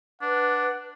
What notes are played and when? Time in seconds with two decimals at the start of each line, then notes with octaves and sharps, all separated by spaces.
0.22 D4 B4 F#5